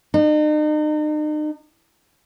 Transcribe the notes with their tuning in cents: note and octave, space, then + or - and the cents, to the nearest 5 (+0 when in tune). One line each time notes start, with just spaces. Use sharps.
D#4 -40